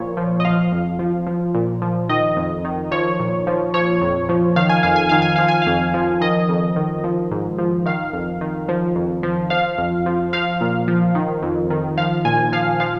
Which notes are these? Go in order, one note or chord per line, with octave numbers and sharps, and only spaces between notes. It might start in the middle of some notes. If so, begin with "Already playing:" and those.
Already playing: A#2 F3 C#5
F3
D#5
F3 F5
F2
F3
F3
A#2
F3
D#3 D#5
F2
D#3
F3 C#5
A#2
F3
F3 C#5
F2
F3
D#3 F5
G#5
F2 F5
G#5
D#3 F5
G#5
F3 F5
G#5
F2 F5
F3
D#3 D#5
F2
D#3
F3
G#2
F3
D#3 F5
F2
D#3
F3
F2
F3
F3 F5
F2
F3
F3 F5
A#2
F3
D#3
F2
D#3
F3 F5
A#2 G#5
F3 F5
F3 F5